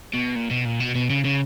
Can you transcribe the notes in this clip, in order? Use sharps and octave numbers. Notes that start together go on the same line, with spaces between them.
B2
A#2
B2
A#2
B2
B2
C#3
C#3